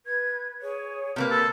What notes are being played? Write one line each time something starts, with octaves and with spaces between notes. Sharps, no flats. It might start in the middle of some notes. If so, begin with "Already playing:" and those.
B4 G#6
G#4 C#5
C3 A3 A#3 B4
A4 E6